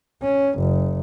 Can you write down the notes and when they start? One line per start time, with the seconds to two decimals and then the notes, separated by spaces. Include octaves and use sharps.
0.22 C#4
0.59 F#1